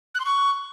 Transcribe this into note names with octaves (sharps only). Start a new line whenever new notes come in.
F#6
C6
C#6